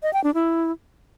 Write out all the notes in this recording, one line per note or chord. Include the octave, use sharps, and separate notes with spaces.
D#5
G5
D4
E4